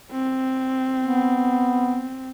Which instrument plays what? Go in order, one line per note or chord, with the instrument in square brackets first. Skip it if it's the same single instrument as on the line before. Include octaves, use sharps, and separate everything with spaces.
[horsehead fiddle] C4
[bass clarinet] B3